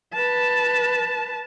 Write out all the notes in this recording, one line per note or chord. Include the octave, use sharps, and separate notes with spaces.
B4 A5